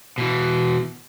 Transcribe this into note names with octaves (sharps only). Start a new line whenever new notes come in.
B2 E3